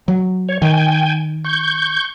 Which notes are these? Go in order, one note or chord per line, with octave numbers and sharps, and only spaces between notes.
F#3
C#5
D#3 G5 G#5
C#6 G6